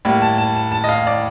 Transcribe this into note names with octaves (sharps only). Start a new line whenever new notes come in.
A2 G3 A#3
A5
A5
A5
A5
D#5
F5
D5